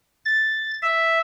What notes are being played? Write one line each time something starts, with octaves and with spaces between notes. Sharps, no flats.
A6
E5